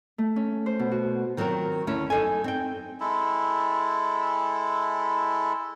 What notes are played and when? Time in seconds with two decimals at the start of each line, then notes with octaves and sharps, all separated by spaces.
0.18 A3
0.36 C#4
0.66 C5
0.79 B2
0.91 F#4
1.37 D#3 F#3 C4 F4 A#4
1.87 D2 A3 C#4 E4
2.10 F#2 D#4 A4 G#5
2.44 C4 G5
3.00 G#3 E4 A4